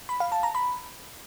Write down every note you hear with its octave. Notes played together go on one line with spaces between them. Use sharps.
B5
F5
A5
A#5
B5